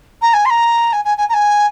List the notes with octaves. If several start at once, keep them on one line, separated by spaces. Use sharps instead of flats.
A#5
G#5
C6
A#5
G#5
G#5
G#5
A#5
G#5